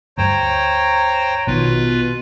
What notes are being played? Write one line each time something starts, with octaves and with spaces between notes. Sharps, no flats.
D2 G2 G3 C5 C#5 G5 A#5
A#1 B2 D#3 F4 B4